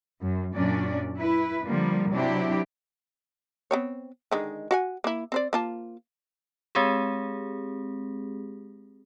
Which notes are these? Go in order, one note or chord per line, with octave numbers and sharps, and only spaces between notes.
F#2
F#2 A#2 F#3 C#4 D4 D5
E4 B4
D3 F3 G3 A#3
C3 F#3 C4 D4 E4 G4
B3 C4 C#5
D3 D#3 G#3
F#4 F#5 G#5
A#3 E4
C4 C5 D5
A#3 F4 A5
G#3 C4 G4 G#4